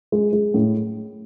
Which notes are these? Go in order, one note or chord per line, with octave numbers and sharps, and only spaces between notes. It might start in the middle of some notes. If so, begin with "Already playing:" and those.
G#3
G#3
A2